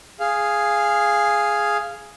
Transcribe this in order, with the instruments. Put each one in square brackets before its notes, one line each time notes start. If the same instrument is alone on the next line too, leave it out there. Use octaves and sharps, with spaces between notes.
[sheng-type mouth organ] G#4 F5